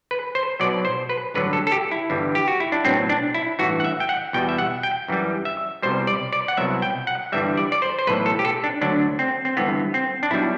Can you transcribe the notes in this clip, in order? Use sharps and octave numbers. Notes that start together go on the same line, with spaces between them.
B4
C5
B1 B2 F#3 D5
C5
B4
A1 G2 D3 F#3 B4
A4
A4
G4
E4
G1 G2 E3 G3
G4
F#4
E4
D4
B1 A2 F#3 C4
D4
E4
A1 G2 E3 F#4
F#5
E5
G5
F#5
E2 B2 G3 G5
E5
F#5
G5
F#2 E3 G3
E5
C2 B2 G3 C5
D5
D5
F#5
C2 B2 F#3 E5
G5
F#5
G1 G2 E3 G3 E5
D5
D5
C5
C5
B1 A2 E3 B4
A4
G4
A4
D4
D2 D3 F#3 D4
C4
C4
G1 G2 E3 B3
C4
D4
B1 B2 G3 E4